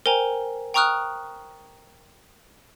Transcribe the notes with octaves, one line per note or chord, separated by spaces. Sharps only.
A#4 C5 G5 G#5 A#5
G5 A#5 C#6 D#6 F6 F#6